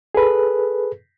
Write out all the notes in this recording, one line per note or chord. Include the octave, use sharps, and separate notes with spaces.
G#4 A4 B4